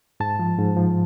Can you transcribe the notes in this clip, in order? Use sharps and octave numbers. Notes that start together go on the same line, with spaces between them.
G#2 A5
F3
G#2
F3